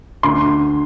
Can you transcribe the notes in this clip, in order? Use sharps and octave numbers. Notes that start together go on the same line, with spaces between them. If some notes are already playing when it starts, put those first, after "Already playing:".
D2 C6